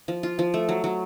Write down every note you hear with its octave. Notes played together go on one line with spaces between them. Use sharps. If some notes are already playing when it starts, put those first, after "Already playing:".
F3
F4
F3
A3
F#3
F#3